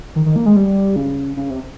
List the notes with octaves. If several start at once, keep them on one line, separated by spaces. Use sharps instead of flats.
D#3
D#3
A#3
G#3
G3
C#3
C#3
C3